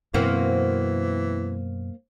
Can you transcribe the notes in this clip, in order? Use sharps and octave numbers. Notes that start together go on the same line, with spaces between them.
F#2 B2 E3 A#3 C4 F#4